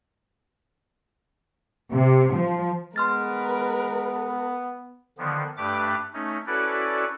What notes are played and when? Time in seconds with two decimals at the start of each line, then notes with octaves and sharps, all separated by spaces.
1.91 C3
2.34 F3
2.96 G#3 B3 A#4 B4 C6 F6 A6
5.18 D3 D#3 F3 B3
5.57 G2 A3 D4 G4 B4 D6
6.14 A3 C#4 D#4
6.47 C#4 E4 F#4 A4 B4 D5